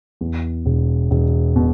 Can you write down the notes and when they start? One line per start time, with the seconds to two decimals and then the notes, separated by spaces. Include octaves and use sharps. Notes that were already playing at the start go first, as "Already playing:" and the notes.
0.21 E2
0.66 E1
1.11 E1
1.56 B2